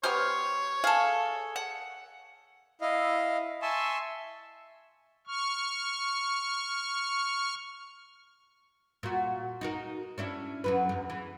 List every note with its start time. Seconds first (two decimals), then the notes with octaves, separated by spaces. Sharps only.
0.04 B3 G4 C5 C#5 F6
0.84 G#4 A4 F5
1.56 F#5
2.81 E4 D#5 F5
3.62 E5 G#5 A5 C6 C#6 E6
5.27 C#6 F6
9.03 A#2 F#4
9.61 D#4 F#4 A#4
10.18 C#4 D4 E4
10.64 F#2 F#3 B4
10.89 E2
11.10 E3